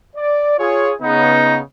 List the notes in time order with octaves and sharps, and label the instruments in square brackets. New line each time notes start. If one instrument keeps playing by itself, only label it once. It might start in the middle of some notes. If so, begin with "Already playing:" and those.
[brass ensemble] D5
F4 G#4 C#5
[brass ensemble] C#3 B3 [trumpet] D#4